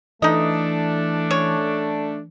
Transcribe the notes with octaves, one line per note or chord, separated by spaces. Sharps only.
E3 A3 D4 D#4 D#5
C#4 C#5